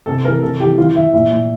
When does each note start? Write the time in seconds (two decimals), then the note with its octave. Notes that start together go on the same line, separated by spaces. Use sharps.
0.06 C3 A4
0.24 E3 A#4
0.42 C3 A4
0.59 E3 G4
0.77 E3 F4
0.95 E3 E5
1.13 A#2 E5
1.31 A#2